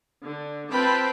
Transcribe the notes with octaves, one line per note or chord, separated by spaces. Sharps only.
D3
C4 F4 B4 G5 A5 B5